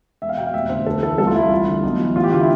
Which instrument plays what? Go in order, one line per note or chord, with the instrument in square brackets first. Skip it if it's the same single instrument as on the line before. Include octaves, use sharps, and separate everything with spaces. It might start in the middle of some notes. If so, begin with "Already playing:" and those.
[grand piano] E1 E5
F5
B2 G5
F5
F1 E5
D3 C5
D2 A4
E3 A4
C2 A4
F4
C2 E4
F4
A1
D3
B1
E3
A1 F4
G4
D3 F4
E4